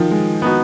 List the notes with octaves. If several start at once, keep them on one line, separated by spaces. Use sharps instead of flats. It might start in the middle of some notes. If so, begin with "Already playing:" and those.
Already playing: D#3 F3
G#3
B3 D#4 F#4